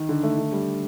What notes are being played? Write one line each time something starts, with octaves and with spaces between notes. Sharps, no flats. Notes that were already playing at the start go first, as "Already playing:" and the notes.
Already playing: D#3
D3
A3
D3
G3